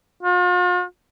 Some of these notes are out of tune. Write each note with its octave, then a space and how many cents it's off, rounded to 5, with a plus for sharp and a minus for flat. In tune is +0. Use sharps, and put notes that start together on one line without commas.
F4 +45